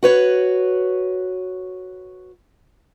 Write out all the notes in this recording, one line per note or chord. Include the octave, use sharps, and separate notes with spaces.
F#4 B4 C#5